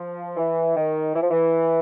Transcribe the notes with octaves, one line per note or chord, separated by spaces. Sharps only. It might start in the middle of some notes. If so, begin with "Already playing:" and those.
Already playing: F3
E3
D#3
E3
F3
E3